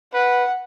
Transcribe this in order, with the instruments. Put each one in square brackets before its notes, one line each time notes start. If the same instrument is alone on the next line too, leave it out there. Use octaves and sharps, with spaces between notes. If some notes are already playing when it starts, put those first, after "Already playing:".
[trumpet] B4 [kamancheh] F#5